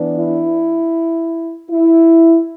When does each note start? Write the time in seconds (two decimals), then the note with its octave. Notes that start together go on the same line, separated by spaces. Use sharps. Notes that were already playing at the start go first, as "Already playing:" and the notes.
Already playing: E3 B3 D4
0.17 E4
1.70 E4